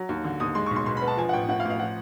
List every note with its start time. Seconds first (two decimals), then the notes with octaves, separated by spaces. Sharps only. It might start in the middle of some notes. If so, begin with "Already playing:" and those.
Already playing: F#3
0.09 D#2
0.24 D3
0.40 D#2 D#6
0.55 G#3 C6
0.66 C#6
0.71 B1
0.76 C6
0.86 B2 C6
0.97 B5
1.02 B3
1.07 A5
1.17 F3 G#5
1.29 F#5
1.33 A1 G5
1.48 A2 F#5
1.60 F5
1.65 A1
1.70 F5
1.79 F3 F#5